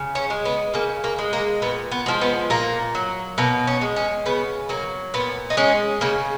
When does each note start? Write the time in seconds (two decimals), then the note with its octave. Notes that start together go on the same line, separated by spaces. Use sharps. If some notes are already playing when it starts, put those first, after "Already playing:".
Already playing: C#3
0.15 C#4
0.30 G#3
0.45 B3
0.74 C#3 A#3
1.04 A#3
1.18 G#3
1.33 A#3
1.62 A#2 B3
1.92 B3
2.06 F3 G#3
2.21 B3
2.50 A#2 A#3
2.95 F#3
3.38 B2 A#3
3.67 C#4
3.81 G#3
3.96 C#4
4.26 C#3 B3
4.69 F#3 A#3
5.14 A#2 B3
5.50 D#4
5.57 G#3 C#4
6.01 C#3 A#3